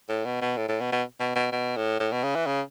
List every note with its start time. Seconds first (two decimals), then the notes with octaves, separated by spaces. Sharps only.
0.09 A2
0.25 B2
0.41 B2
0.57 A2
0.68 A2
0.80 B2
0.92 B2
1.20 B2
1.36 B2
1.52 B2
1.76 A2
2.00 A2
2.12 B2
2.24 C#3
2.35 E3
2.47 C#3